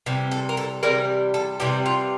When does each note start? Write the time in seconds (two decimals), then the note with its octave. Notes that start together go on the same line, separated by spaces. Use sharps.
0.06 C3 E3 G3
0.31 A4
0.49 A#4
0.57 A4
0.83 C3 E3 G3 A#4
1.34 A4
1.60 C3 E3 G3 G4
1.86 F4